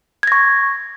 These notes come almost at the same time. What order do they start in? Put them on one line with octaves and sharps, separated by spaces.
G#6 A#6 C#6